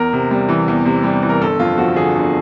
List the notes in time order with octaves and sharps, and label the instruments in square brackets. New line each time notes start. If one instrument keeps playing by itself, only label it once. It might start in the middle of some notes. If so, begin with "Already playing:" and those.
Already playing: [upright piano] E2 A#4
C3
G3
E3
E2
C3
G3
E3
A#4
G1 A4
F2 F4
F3 F#4
D3 G#4
G1